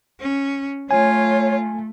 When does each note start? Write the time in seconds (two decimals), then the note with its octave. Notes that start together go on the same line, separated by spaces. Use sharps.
0.20 C#4
0.91 A3 F4 C#5 G#5